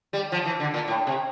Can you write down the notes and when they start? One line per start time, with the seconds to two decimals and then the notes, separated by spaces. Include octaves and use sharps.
0.13 G3
0.32 F3
0.45 E3
0.60 D3
0.74 A#2
0.88 A2
1.07 C3